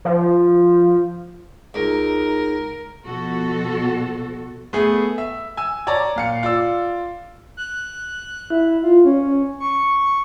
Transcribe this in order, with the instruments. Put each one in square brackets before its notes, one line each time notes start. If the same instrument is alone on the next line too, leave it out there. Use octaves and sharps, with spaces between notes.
[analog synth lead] F3
[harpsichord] C#2 [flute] D#4 [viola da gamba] A#4
[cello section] B2 F3 F#4 A4
[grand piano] A3 B3 G#4
E5
G#5 E6
C#5 D5 A5 A#5
A#2 F5 C#7
F4 D5 E6
[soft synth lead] F#6
E4
F4
C#4
C#6